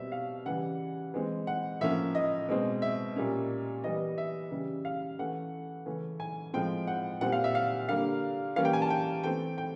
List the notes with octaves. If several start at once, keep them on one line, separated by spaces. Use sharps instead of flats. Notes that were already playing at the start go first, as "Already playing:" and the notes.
Already playing: B2 G3 C4 E5
F5
C#3 E3 G3 F#5
E3 G#3 C4
F#5
A2 F3 A#3 C#4 E5
D#5
B2 G#3 C4
E5
A#2 G3 A#3 C#4
E3 G3 B3 D#5
E5
C#3 E3 G3
F5
E3 A3 C#4 F#5
C#3 E3 A3 C#4
G#5
A2 F3 G#3 C4 G5
F#5
A#2 G3 C4 F#5
F5
E5
F5
D3 G3 A#3 F5
E3 G3 A#3 C#4 F5
G5
G#5
A5
G5
E3 A3 C4 G5
G5